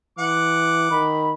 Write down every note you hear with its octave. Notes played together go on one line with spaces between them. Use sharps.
E3 F#5 D6
D#3 B5